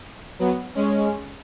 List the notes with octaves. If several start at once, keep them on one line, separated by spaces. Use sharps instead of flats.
F#3 B3
G#3 C#4